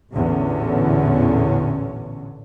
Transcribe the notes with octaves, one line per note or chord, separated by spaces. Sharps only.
A1 E2 A#2 D3 C#4